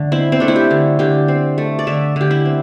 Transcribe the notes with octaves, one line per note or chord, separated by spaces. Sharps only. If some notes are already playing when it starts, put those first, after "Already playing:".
Already playing: D3 A3
C4 E4
C4
A3 D4
E4
G4
D3
D3 G4
C4
A3
D5
D3 E5
D3 G4
E4
C4